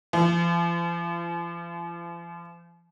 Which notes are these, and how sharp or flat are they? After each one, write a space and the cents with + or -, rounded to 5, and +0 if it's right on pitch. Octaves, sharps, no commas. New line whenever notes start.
F3 -40